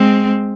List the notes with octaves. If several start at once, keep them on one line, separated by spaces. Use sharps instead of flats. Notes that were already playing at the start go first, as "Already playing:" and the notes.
Already playing: G#3 C4